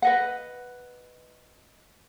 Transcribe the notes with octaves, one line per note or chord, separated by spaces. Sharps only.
B4 D#5 F#5